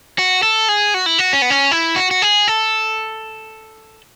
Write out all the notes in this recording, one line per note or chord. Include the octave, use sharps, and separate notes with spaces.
F#4
A4
G#4
F#4
E4
F#4
C#4
B3
C#4
E4
F#4
F#4
G#4
A4